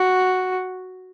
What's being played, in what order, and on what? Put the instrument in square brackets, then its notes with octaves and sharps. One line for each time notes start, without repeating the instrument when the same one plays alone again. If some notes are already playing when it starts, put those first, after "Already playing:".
Already playing: [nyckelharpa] F#4